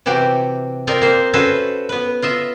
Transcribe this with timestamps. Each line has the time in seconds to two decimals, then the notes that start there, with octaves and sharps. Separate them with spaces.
0.06 C3 E3 F#4 G4
0.87 C4 F4 A#4 D5 D#5
1.01 A#3 C5
1.33 C#4 F#4 A4 B4 C5 E5
1.89 B3 B4
2.22 F4 D#5 E5